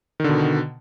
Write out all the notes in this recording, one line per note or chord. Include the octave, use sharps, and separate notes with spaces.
B2 D3 D#3